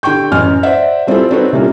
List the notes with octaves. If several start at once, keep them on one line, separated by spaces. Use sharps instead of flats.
D3 G4 G5 C#6 G6
A1 F#2 G#5 F6
C5 D5 E5 F#5
G3 C4 E4 F4 G#4 A4
C4 D#4 F#4 A4 B4 C#5
C3 G3 A#3 C#4 D4 F4